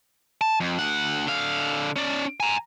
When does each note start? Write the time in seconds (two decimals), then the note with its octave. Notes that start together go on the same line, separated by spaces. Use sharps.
0.41 A5
0.60 F2
0.79 D2 F#5
1.27 D3 F5
1.96 C#4 D5
2.40 G#5 A#5